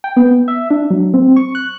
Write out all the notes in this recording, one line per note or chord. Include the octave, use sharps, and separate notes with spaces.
G5
B3
E5
D4
F#3
C4
C#6
F#6